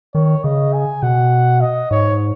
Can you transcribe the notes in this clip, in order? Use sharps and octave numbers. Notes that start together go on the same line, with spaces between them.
D#3 C#5
C#3 D#5
G#5
B2 F#5
D#5
G#2 C#5